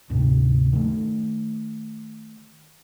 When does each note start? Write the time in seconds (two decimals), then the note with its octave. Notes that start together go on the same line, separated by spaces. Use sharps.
0.10 D2 G#2 C3
0.73 D#3 A3